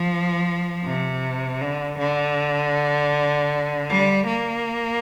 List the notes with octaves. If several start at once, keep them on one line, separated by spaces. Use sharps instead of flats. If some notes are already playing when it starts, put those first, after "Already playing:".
Already playing: F3
C3
D3
D3
G3
A#3